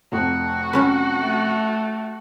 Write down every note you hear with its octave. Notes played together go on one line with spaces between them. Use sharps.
F1 F2 F#4
F#3 C#4 B4
A3